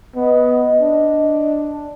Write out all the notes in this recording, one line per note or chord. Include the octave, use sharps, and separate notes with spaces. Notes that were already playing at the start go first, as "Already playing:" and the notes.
B3 D#5
D4